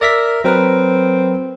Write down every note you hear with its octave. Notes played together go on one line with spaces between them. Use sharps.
A#4 D5 E5 B6
F#3 C4 A#4 B4